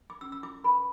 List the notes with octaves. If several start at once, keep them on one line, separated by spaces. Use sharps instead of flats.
D6
C#4 E6
E6
E4 D6
B4 B5